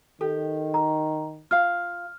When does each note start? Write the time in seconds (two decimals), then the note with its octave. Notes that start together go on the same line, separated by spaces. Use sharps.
0.21 D#3 G4 A4
0.74 A#5
1.51 F4 F5 F6